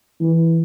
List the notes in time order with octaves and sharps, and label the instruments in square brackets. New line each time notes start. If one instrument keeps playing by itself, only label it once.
[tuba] E3